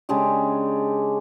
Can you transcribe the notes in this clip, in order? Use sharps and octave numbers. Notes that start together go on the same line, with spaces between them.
C#3 G#3 D4 G4